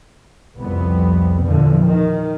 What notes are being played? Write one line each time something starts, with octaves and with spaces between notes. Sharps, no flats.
C2 F2 B3
E2 A#2 D3 F3
D#3